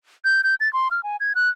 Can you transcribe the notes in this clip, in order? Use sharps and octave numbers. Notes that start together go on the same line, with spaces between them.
G6
G6
A6
C6
F6
G#5
G#6
F#6